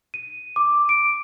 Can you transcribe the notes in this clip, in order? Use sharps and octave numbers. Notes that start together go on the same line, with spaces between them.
D#7
D6
D7